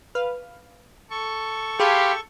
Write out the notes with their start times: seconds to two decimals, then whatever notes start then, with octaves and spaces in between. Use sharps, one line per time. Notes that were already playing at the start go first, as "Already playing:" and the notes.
0.15 B4 F5 F6
1.10 A4 C#6
1.80 G4 G#4 F5 A5 B5 C6 G#6